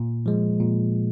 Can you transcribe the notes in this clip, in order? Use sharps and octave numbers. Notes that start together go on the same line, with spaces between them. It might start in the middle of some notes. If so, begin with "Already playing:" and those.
Already playing: A#2
F3 G#3
A#2